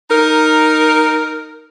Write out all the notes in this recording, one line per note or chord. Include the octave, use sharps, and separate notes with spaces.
D#4 A#4